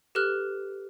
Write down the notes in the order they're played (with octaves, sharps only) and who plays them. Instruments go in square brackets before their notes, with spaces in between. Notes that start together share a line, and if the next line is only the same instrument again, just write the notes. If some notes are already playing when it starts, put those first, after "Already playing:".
[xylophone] G4 A4 B4 F6 F#6